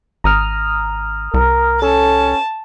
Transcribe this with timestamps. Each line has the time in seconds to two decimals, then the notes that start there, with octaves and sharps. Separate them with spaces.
0.24 G#1 A#5 D#6 F6
1.34 C2 A#4
1.82 C#4 A4 A5